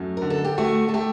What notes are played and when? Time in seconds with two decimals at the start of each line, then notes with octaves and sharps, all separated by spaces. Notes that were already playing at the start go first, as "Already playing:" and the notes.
Already playing: F#2 A3 F#4
0.17 D3 A#4
0.30 A4
0.44 G4
0.58 A3 F#4
0.88 A4
0.94 A3 G4